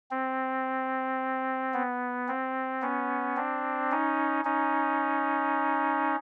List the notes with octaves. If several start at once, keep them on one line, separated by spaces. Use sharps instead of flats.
C4
B3
C4
B3 C#4
C4 D4
C#4 D#4
C#4 D#4